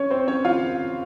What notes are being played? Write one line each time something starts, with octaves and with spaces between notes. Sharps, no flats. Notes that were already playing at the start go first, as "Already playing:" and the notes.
Already playing: C#4 C#5
C4 C5
C#4 C#5
F4 F5